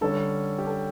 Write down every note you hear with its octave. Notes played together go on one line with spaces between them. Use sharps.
D3 G3 C#4 A4
G4
A4